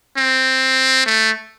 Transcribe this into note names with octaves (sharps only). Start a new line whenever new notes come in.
C4
A3